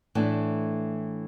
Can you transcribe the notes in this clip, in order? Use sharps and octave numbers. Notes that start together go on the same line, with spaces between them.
A2 E3 A3 D4